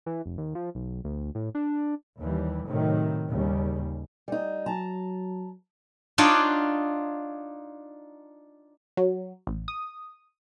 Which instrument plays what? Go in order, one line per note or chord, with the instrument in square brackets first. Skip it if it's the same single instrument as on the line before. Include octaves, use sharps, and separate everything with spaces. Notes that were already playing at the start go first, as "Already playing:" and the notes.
[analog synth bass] E3
F1
D#2
F3
B1
D2
A2
D4
[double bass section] D#2 E3 G3
A2 C3 D#3 F#3
D#2 C#3 G3
[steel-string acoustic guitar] G3 D#4
[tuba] F#3 [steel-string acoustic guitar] A5 A#5
[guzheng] D4 D#4 F4 C#5 D5 F#5
[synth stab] F#3
A1
D#6